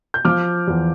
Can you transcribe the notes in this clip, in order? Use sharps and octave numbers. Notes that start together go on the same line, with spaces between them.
G6
F3 D6 F6
E2